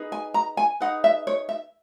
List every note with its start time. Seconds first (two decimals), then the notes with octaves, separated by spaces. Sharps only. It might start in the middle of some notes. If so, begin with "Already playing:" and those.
Already playing: D#4 G#4 B4
0.12 G#5
0.34 A#5
0.57 G#5
0.80 D#4 G#4 B4 F#5
1.04 E5
1.27 C#5
1.49 E5